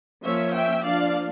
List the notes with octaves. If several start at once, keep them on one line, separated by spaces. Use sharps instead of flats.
F3 A#3 C#4 C#5 E5
E5 G5
F3 A#3 D4 D5 F5